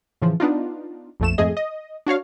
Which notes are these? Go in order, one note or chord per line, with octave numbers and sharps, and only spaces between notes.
A2 C#3 E3 F3
B3 D4 D#4 F4
A#1 F2 A3 E7
F2 G#2 A3 G#4 D#5
D#5
D4 F#4 C#5 F5